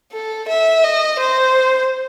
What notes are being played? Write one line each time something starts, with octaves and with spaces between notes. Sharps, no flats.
A4
E5
D#5
C5